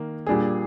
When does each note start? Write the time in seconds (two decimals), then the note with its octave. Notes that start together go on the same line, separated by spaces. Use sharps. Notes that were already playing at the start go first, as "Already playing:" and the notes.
Already playing: D#3 A#3
0.27 A#2 G3 D4 G#4